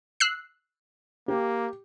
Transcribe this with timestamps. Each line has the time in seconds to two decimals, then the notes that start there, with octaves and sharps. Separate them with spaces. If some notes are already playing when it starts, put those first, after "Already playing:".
0.20 E6 F#6 C7
1.28 A#3 G4